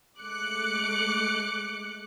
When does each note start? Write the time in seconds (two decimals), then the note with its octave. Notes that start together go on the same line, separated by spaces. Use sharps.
0.19 G#3 A3 D6 F#6 C#7